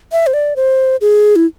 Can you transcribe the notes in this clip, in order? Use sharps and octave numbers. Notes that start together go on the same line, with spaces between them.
E5
C5
D5
C5
G#4
E4